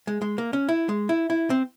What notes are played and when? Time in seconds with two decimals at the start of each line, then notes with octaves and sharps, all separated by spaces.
0.07 G#3
0.22 G#3
0.38 A#3
0.53 C#4
0.69 E4
0.89 G#3
1.09 E4
1.30 E4
1.50 C4